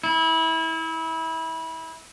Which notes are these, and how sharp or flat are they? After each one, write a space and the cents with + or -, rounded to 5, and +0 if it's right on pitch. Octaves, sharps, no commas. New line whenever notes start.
E4 -25